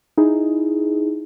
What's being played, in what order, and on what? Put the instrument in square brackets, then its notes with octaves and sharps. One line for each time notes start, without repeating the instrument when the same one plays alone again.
[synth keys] D#4 E4 G#4